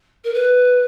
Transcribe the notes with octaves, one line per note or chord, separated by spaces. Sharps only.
A#4
B4